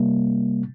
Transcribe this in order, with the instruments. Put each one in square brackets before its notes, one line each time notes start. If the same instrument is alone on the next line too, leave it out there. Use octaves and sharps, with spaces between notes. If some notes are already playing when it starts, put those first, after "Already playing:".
Already playing: [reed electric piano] C3 G3 A#3